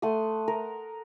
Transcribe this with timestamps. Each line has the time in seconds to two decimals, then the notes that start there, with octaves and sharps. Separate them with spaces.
0.02 A3 F#5 C6 D#6
0.48 A#4